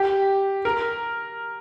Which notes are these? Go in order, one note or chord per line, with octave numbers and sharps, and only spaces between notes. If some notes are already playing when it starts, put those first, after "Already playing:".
Already playing: G4
A#4